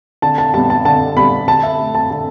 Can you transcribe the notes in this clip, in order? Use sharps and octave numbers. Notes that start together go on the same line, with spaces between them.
D3 A5
A5
G3 B3 A5
A5
D3 A5
G3 B3 B5
D3 A5
E5
A3
A5
D3 A5